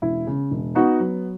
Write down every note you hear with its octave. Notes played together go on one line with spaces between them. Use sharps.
E1 E4
C#3
E1
B3 D#4 F#4
F#3